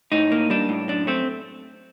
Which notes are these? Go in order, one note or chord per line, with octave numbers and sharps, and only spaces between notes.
A2 D#4
A#3
G3 D4
A2
F#2 D4
A3 C4